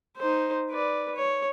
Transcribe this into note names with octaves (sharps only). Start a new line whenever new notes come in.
D#4 C5
B4 D5
C#5